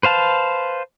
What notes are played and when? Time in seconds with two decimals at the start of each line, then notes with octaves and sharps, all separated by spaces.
0.03 B4 C5 F5 A5